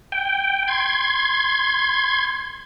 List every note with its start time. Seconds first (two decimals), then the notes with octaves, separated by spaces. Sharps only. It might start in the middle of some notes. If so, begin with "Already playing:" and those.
0.12 G5
0.68 C6 G#6